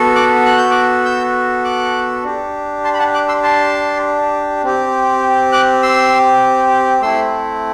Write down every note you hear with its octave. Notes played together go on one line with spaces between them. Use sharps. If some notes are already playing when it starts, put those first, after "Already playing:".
Already playing: B3 F#4 A4
D6 F#6
F#6
G6
D6 F#6
E6 G6
D6 F#6
D4 G4
A5 C6
B5
F#5 A5
D6 F#6
C6 E6
A5 C6
C4 G4
D6 F#6
C6 E6
A3 C4 E4 C6 E6